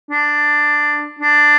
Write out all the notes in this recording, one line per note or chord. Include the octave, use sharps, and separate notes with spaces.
D4
D4